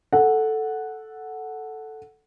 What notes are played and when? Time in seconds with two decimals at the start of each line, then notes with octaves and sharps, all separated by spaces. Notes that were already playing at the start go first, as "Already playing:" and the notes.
0.13 A4 F#5